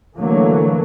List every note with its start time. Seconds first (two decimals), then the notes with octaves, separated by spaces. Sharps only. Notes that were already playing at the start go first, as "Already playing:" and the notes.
0.18 D3 E3 F#3 A3 A#3